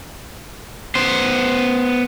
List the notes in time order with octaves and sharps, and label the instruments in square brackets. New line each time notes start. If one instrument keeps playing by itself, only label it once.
[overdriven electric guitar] B3 C5